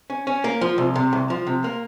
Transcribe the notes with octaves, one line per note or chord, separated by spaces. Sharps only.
C#4
C#4
A#3
F3
C2
C3
C2
F3
C3
A#3